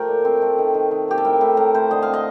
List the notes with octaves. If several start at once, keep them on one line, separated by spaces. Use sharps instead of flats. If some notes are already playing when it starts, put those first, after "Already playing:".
Already playing: F3 A3 G4 A#4
A#2
C4
A3
D#3
D#3
D#3
A#3 G4
A4
A2 A#4
A2 A4
A2 A#4
A2 C5
D3 D#5
F5
C4
D#5